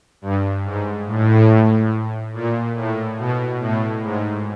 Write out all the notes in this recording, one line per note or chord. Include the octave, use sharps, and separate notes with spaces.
G2
G#2
A2
A#2
A2
B2
A2
G#2